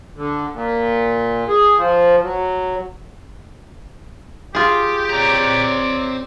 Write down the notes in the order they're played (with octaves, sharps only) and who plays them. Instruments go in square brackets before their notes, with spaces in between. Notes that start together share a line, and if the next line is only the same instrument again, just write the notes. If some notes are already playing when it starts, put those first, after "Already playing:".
[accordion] D3
A#2
G#4
F3
F#3
[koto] F4 G#4 [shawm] G4
[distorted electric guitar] C4 A#5 [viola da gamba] C#5 D5